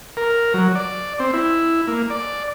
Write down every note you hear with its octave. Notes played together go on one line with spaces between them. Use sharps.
A#4
F#3
D5
C4
E4
A#3
D5